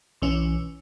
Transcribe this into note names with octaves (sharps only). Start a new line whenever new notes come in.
B1 E3 C#4